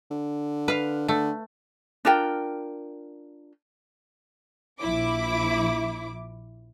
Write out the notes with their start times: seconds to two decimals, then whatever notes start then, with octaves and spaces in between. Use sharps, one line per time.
0.11 D3
0.68 B4 F5
1.08 D3 A3
2.05 D4 F4 A#4 G5
4.80 A#1 F3 E4 D6